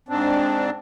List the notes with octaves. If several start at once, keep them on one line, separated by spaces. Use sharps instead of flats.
G#2 C4 D4